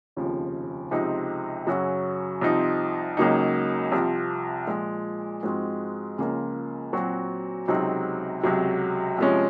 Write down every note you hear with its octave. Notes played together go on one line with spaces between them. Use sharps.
F1 D#2 C#3 F3
C#2 C3 F3 C4 D#4
F#2 C#3 F#3 C#4 F#4
C2 C3 F3 C4 D#4
C#2 C#3 F#3 A#3 D#4
C2 C3 F3
A#2 F3 G#3
G#2 F3 G#3 C4 F#4
C#2 C#3 F3 A#3 F4
A#2 F#3 C4 F#4
C#2 C3 F#3 C4 D#4
C#2 C3 F#3
C2 C3 F3 G#3 C#4